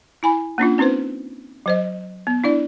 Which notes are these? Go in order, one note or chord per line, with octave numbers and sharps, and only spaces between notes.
E4 G#5 B5
A#3 C#4 D4 F4
C4 C#4 D#4 B4 C5
F#3 C5 D#5
B3
D4 E4 D5